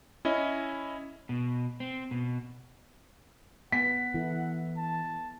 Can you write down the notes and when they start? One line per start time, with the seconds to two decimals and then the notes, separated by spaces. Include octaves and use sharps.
0.25 C#4 E4 D#5
1.29 B2
1.80 C4
2.11 B2
3.72 B3 F#5 B6
4.14 E3 B3 E4 A4
4.77 A5